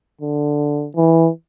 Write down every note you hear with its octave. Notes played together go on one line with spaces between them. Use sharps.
D3
E3